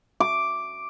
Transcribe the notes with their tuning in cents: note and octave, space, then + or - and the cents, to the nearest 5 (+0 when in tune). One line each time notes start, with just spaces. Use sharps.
D6 +0